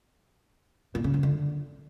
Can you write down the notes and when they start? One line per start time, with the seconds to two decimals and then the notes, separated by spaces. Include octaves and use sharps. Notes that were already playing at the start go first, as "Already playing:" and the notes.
0.95 A#2
1.04 C#3
1.14 F#2
1.23 D3